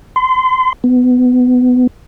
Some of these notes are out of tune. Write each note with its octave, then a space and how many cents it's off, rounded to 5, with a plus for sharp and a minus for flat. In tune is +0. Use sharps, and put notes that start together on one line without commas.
C6 -30
B3 +20